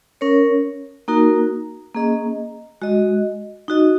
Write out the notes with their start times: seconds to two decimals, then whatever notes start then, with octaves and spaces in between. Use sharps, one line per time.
0.21 C#4 A#4 C#5
1.08 A#3 D#4 F#4 A#4
1.94 A#3 C#4 G#4 D#5
2.82 G#3 F#4 D#5
3.68 D#4 F#4 D#5